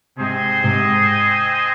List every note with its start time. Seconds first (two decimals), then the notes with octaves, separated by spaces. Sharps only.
0.19 G#2 C3 C4 G#4 C5 D#5
0.63 G#2 C3